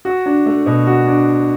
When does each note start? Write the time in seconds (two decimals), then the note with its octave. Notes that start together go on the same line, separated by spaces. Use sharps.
0.05 F#4
0.26 D4
0.46 A3
0.66 B2
0.87 F#4
1.07 D4